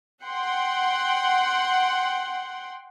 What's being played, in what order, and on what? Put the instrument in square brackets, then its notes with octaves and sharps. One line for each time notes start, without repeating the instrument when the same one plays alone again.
[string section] F#5 G5 C6